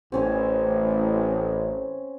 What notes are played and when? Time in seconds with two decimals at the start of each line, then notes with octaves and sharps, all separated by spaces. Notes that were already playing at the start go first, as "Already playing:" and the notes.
0.12 A1 C4 C#4 C#5